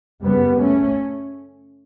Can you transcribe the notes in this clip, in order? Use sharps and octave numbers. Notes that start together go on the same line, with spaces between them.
F#2 C#3 G3 B3
A3 C#4